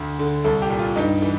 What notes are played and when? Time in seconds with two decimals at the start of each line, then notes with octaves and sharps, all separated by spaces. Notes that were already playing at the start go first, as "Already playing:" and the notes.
Already playing: D2
0.19 D3
0.44 C2 A4
0.62 G4
0.70 A#2
0.79 F4
0.96 G2 D#4
1.22 E3